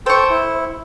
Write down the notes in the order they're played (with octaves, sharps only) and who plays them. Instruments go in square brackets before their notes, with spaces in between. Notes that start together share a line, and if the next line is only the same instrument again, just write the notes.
[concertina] A4 G5 [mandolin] C5 C#6
[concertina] E4